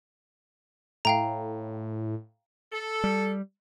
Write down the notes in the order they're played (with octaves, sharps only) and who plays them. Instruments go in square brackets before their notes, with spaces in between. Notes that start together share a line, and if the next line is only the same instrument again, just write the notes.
[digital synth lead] A2 [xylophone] F5 G5 A#5
[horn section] A4
[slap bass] G3